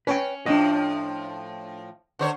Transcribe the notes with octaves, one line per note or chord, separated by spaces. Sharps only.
C#4 B4 C#5 G5
A2 F3 D4 D#5
D3 C5 C#5